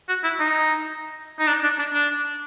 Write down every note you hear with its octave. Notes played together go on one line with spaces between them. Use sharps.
F#4
E4
D#4
D#4
D4
D4
D4
D4